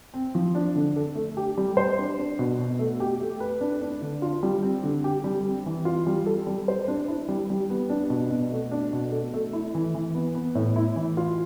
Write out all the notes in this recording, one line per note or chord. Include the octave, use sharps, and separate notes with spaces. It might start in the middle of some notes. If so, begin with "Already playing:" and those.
C4
F3
D4
D3
A4
A3
G4
G3
C5
D4
D4
B2
B2
A3
G4
A3
B4
D4
D4
D3
F4
G3
C4
D3
G4
G3
C4
E3
F4
G3
A4
G3
C5
D4
E4
G3
G3
B3
D4
B2
B2
A3
D4
B2
A4
A3
E4
E3
E3
B3
B3
A2
E4
E3
F4